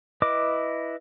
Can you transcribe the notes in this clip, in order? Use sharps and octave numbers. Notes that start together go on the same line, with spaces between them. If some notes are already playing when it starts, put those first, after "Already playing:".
E4 B4 D#5 D6